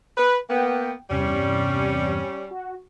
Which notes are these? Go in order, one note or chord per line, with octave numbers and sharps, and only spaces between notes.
B4
A#3 B3 G5
E2 G2 C3 G3 C#4
F#4